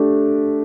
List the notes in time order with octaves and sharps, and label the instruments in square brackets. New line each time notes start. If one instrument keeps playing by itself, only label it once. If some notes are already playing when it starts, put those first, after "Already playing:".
Already playing: [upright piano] A3 D4 G4